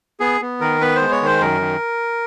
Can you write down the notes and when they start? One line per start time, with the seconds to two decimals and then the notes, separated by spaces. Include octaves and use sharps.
0.20 B3 G#4
0.41 B3
0.61 D#3 A#4
0.81 B3 B4
0.96 C5
1.01 G#3
1.11 C#5
1.21 D#3 C5
1.41 F#2 A#4
1.61 D#3